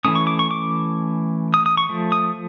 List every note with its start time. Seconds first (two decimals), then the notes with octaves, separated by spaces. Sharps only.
0.05 E3 A3 C#4 D#6
0.15 C#6
0.27 D6
0.39 C#6
0.51 D6
1.54 D#6
1.66 D#6
1.77 C#6
1.89 F3 A3
2.12 D#6